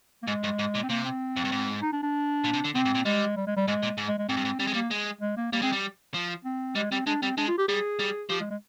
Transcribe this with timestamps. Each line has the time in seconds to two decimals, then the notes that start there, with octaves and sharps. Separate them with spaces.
0.23 A#3
0.27 G#2 G#3
0.43 G2
0.59 G#2
0.75 A#2
0.83 C4
0.89 C3 A#3
1.05 C4
1.36 F2
1.45 G2
1.52 G#2
1.82 D#4
1.93 D4
2.03 D4
2.44 A#2
2.53 C3
2.64 D3
2.75 C3 C4
2.85 G#2
2.95 A#2
3.05 G3 G#3
3.37 G3
3.47 G#3
3.57 G3
3.68 G#2 G#3
3.83 A#2
3.97 G#2
4.08 G#3
4.19 G#3
4.29 G#2 C4
4.37 G2
4.45 G#2
4.60 G3 C4
4.67 G#3
4.74 G3 A#3
4.91 G#3
5.21 G#3
5.37 A#3
5.52 G3 A#3
5.62 G#3 C4
5.72 G3
6.14 F3
6.45 C4
6.75 G3 G#3
6.91 G3 C4
7.06 G#3 D4
7.22 G3 C4
7.38 G#3 D4
7.48 F4
7.58 G4
7.68 G3 G#4
7.99 G3
8.30 F3 G4
8.40 G#3
8.51 G#3